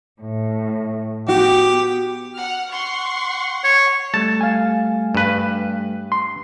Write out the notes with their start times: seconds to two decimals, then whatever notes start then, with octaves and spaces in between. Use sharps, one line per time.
0.21 A2
1.28 B3 F#4 G4
2.36 F#5 F6
2.71 F#5 C6 C#6
3.64 C#5
4.14 G3 A3 A5
4.41 F5 G#5
5.15 G2 B4
6.12 C6